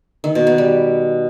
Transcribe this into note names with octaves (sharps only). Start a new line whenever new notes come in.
D#3
B2
B3
G3